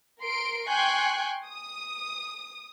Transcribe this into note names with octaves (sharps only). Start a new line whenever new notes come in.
A#4 C6 D7
G5 G#5 C6 C#6 F#6 G6
D#6